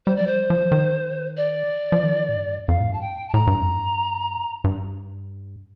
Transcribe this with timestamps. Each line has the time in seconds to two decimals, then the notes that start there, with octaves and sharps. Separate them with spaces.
0.06 G3 C5
0.16 F3 D5
0.27 G3 C5
0.50 F3
0.72 D#3
1.37 D5
1.92 F3
2.03 D#3
2.29 A2
2.36 G2
2.68 F2 F5
2.80 A2
2.90 G2 A5
3.01 G5
3.29 A5
3.34 A2 A#5
3.47 G2
3.60 F2
3.73 G2
4.64 G2